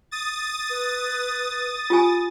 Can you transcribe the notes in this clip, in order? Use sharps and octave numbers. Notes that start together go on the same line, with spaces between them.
D#6 A6
B4
F4 G4 G#5